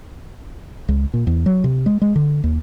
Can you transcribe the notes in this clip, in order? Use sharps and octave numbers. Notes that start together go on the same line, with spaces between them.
C#2
A#2
E2
F#3
C3
G#3
G#3
D3
D#2